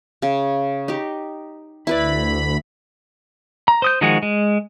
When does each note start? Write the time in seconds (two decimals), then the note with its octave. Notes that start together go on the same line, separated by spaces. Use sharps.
0.22 C#3
0.88 D#4 G4
1.87 D2 E4 B4 D5 B5
3.68 A#5
3.82 C5 D#6 G6
4.01 D#3 F3 G#3 F#4 G#4
4.23 G#3